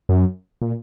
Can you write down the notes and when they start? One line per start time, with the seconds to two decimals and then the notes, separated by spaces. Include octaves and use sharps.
0.09 F#2
0.62 A#2